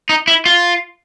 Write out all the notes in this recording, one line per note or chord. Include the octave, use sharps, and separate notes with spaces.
D#4
E4
F4